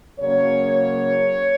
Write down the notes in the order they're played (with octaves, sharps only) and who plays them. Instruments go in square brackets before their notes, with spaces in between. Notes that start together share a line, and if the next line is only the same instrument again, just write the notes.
[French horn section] C#3 F#3 A#3 C#4 C#5